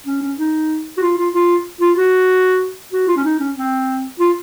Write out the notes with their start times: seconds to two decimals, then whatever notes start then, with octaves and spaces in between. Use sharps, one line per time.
0.06 C#4
0.22 C#4
0.39 D#4
0.97 F#4
1.02 F4
1.18 F4
1.34 F4
1.81 F4
1.97 F#4
2.93 F#4
3.08 F4
3.16 C#4
3.25 D#4
3.40 C#4
3.56 C4
4.19 F4